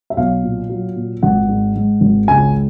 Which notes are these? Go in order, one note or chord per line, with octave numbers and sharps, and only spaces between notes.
E5
B1 F5
A#2
F#3
A#2
G#1 F#5
G#2
G#2
G#1
C#2 G#5